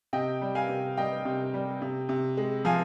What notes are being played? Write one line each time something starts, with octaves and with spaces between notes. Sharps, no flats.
C3 D#5 G5
G3
F5 G#5
C3
G3 D#5 G5
C3
G3
C3
C3
G#3
F3 F5 G#5